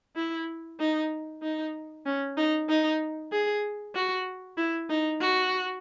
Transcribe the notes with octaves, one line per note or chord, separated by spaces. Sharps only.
E4
D#4
D#4
C#4
D#4
D#4
G#4
F#4
E4
D#4
F#4